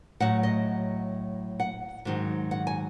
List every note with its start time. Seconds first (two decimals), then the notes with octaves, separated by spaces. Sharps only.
0.20 A2 F#3 F#5
0.43 D#5
1.60 F#5
2.05 G#2 D#3 F#3
2.51 F#5
2.67 G#5